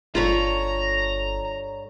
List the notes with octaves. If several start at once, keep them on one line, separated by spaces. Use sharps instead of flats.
G1 G2 F4 A4 C#5 A#5 B5